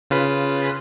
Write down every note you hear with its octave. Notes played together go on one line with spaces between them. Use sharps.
C#3 F4 B4